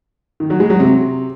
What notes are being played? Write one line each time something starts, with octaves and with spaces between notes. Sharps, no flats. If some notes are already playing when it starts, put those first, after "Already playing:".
D#3
F#3
G#3
F#3
C3